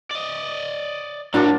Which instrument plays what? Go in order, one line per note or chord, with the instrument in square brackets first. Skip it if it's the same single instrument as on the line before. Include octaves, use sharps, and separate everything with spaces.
[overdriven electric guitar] D5 D#5
[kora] A2 F#4 [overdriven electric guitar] F#3 G3 [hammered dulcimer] A#3 F4 A5 [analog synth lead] D4